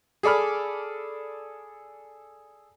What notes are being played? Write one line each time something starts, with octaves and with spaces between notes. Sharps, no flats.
G#4 A4 D5 B5 F6